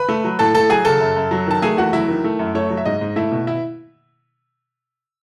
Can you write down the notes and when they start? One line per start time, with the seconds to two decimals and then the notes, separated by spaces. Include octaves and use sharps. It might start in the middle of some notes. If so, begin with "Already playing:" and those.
Already playing: B4 B5
0.09 A3
0.24 F#3
0.39 A2 A4 A5
0.54 A2 A4 A5
0.69 F#3 G#4 G#5
0.85 C#3 A4 A5
1.00 F#2
1.16 F#2
1.31 F#3
1.47 D#3 A5
1.62 A3 G#4 G#5
1.77 E2 F#4 F#5
1.93 F#3 E4 E5
2.08 D#3
2.24 A3
2.39 F#2
2.55 A3 C#5
2.70 F#3
2.77 E5
2.85 G#2 D#5
3.01 G#2
3.16 A3 E4 E5
3.32 B2
3.47 E4 E5